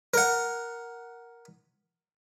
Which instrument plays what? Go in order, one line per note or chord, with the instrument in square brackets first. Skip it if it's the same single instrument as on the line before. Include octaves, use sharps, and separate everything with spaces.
[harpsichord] A#4 F#5